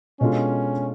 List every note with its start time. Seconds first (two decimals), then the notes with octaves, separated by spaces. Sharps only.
0.20 B2 G#3 C#4 D4 F4 A4